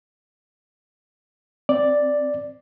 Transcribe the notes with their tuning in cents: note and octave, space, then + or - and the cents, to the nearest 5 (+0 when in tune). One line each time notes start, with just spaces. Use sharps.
C4 -5 D5 +0